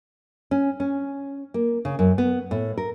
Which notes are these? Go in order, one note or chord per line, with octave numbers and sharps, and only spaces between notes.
C#4
C#4
A#3
C#3
F#2
B3
A2
A#4